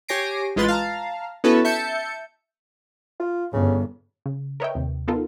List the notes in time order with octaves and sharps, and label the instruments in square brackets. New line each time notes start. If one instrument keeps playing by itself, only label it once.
[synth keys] G4 C#5 G#5 A#6 C7 D7
A1 G#3 F4 B4 C6 A6
F5 A5 A#5
B3 C#4 E4 F#4 A4 B4
E5 A5 G6 C#7
[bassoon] F4
[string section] G1 [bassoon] C#3
[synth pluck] C#3
A#4 B4 C#5 D#5 E5 G5
D#2 C3
B3 D#4 F4 A4 A#4